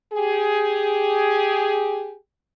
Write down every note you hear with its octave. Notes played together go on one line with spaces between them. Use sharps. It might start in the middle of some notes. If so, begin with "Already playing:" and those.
G4 G#4